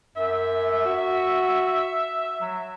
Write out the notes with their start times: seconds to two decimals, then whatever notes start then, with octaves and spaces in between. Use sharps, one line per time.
0.16 F#2 E5
0.86 F#4
2.42 F#3